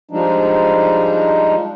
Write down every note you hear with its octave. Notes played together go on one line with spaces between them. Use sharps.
F3 G3 G#3 D4 D#4